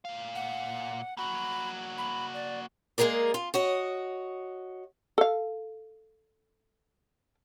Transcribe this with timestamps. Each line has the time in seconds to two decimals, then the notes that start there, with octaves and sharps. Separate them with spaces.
0.05 A#2 F5
0.35 F#5
1.17 A#3 F#4 B5
1.98 B5
2.34 D5
2.98 G#3 A#3 G#4 A#4 D5
3.34 F4
3.54 F#4 C#5 D#5
5.18 A4 F5